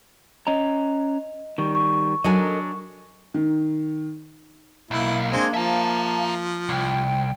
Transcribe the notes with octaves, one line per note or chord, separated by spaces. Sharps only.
C#4 C#5 D#5 A#5
D#3 G3 C#6
C#6
F#3 D4 A4 A#4 D#5 G#5
D#3
B1 A#3 E4
G#3 C4 D4 G#6
F3 E5 F5 A5 A#5
C2 G5